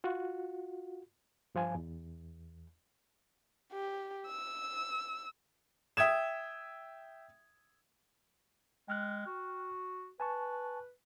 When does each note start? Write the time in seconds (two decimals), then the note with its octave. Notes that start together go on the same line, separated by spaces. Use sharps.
0.04 F4 F#4
1.55 G2 F3 F4 G#5
1.75 E2
3.72 G4
4.27 E6
5.97 E5 G5 D#6 G#6 E7
8.88 G#3 G5 F6 F#6
9.26 F#4
10.20 B4 G#5 A5 C#6